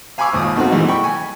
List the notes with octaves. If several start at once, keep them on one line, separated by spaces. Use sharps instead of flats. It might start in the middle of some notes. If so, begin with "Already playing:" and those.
F5 G#5 B5 C#6 D6 E6
G#1 D#2 A#2 D#3 D#6
B2 D#3 A3 C4 F#4
A#2 E3 G3 G#3
G5 B5 C#6
G#5